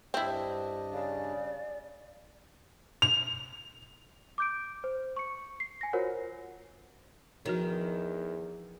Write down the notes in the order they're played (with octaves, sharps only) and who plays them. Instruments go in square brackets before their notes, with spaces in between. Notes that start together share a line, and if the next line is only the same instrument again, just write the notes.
[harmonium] G2 D4 D#5 [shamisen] C4 E4
[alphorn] C#3 [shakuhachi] D5
[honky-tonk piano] F7
[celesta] D6 G6 D7
C5
C#6 C#7
C7
G#5 A#6
F4 F#4 A#4 C5 C#5 F#5
[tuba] E2 [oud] D#3 [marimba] F3 F#4 C#5